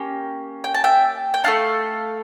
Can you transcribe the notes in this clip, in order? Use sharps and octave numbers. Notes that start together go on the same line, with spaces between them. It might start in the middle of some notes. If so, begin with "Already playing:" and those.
Already playing: A#3 C#4 G4
G5
A5
E5 G5
G5
A3 E4 A4 F5 A5